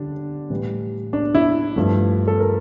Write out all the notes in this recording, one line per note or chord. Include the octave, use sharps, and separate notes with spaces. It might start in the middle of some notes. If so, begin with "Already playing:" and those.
Already playing: D3 G3 D4
A2 E3 G3
D4
E4
G2 F3 A3
A4
A#4